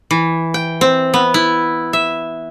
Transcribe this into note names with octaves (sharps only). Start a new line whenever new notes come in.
E3
G5
C4
B3
E4
E5